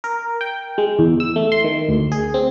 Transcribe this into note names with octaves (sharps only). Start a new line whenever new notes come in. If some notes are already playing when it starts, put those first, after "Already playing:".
A#4
G5
G#3
E2
E6
A3
C6
D#3
D2
G#4
C4